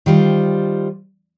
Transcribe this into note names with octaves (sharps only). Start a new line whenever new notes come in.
D#3 G3 F4 C5